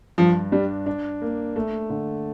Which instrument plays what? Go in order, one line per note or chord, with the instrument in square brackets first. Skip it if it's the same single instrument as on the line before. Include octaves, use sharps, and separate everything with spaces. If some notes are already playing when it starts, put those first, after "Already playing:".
[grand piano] G2 [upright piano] F3
[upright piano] G3 [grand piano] D4
[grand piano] D4
A#3
A3
D3